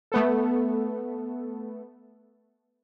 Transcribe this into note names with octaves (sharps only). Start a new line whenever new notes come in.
A3 B3 A4